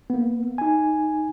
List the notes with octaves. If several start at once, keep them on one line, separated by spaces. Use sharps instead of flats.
A#3 B3
D#4 G#5